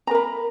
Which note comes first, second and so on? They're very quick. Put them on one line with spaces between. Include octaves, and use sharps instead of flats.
A#5 A#4 B5